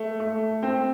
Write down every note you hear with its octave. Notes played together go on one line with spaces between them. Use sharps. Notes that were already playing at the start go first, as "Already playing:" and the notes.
Already playing: A3
A3
C4